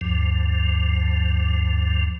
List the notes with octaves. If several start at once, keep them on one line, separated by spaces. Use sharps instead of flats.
D2 G2 F3